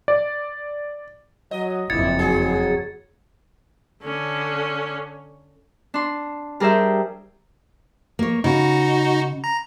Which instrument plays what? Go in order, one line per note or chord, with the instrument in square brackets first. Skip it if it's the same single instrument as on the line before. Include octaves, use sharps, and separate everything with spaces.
[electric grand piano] D5
[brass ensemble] F#3 [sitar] D#5
[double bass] F#1 F2 [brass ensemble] F3 D4 E4 [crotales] G#6 A6 C#7
[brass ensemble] F#3 [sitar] G#4
[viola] D3 C#4
[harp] D4 C6
G3 G#4 A#4 C5 E5 G5
[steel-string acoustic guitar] A#3 C#5
[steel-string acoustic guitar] C#3 [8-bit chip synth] D#4 F#4
[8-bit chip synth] A#5